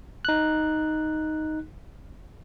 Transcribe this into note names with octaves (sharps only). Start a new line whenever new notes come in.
D#4 F#6